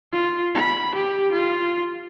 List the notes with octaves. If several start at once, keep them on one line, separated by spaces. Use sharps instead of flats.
F4
B5
G4
F4